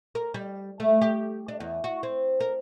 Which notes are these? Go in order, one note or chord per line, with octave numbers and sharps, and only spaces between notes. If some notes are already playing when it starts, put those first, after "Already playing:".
A#4
G3
A3
G4
D4
E2
F#4
C4
A#4